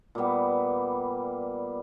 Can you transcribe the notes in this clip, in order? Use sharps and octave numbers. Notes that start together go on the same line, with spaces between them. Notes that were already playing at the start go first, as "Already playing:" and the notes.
A#2 G3 B3